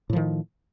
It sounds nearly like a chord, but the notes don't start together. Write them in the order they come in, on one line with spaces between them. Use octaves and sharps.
A2 F3 D#3